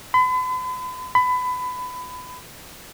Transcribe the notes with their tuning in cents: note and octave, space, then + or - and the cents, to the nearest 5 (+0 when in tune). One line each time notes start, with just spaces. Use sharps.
B5 +45
B5 +25